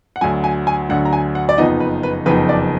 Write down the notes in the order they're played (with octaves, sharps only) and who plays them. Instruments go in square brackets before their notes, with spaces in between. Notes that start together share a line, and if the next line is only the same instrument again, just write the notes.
[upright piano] F#5
D2 D3 F#3 G#5
G#5
G#5
D2 D3 F#3 F#5
A#5
G#5
F#5
D5
F#1 F2 F3 B3 D#4 D#5
B4
B4
F#1 F2 F3 B3 D#4 B4
D5